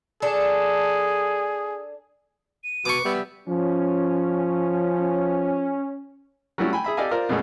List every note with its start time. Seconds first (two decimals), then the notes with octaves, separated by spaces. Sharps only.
0.22 D4 G#4 A4
2.64 D#7
2.85 B2 B4 C#6 D6
3.05 G3 B3 E5
3.48 F3 C#4
6.58 F#3 G3 A3 C#4 E4
6.73 G5 G#5 B5
6.84 G#4 E5 B5
6.97 G4 A4 D5 D#5 F5 G#5
7.11 F4 A#4 C5 D5
7.29 F#2 B2 G#3 A3 C#4